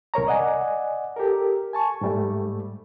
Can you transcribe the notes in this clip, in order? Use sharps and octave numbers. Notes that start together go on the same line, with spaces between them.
C2 A#4 C#5 A#5
D5 D#5 F#5 G#5
G4 A4 A#4
G#5 A5 C#6
G#2 G3 A3